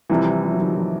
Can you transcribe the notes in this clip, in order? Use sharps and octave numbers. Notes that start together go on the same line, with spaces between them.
C2 C3 E3 F3 G3
F3
F#3
D#3 F3
D#3 F3